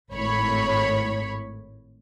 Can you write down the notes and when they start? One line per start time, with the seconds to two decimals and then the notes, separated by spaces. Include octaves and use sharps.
0.13 G#1 A2 C#5 B5